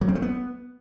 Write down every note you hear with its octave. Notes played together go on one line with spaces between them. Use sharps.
F#3
C4
A3
B3